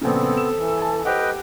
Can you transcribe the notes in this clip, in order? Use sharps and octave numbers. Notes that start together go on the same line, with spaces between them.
A#1 C#3 B3 C4 A4
E7
E3
G#5 A5
G4 B4 C5 D#5 F#5 G5